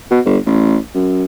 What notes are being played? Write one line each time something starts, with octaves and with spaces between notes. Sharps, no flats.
B2
G1
A1
F#2